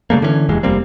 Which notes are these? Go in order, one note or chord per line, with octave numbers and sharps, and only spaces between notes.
C#3 G3 A3 A#3
D3 E3 G#3 C#4
F1 D#2 E3 G#3
F1 G3 A#3 C4